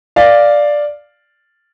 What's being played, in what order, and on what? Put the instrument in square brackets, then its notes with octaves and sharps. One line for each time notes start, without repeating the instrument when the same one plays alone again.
[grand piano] D5 F5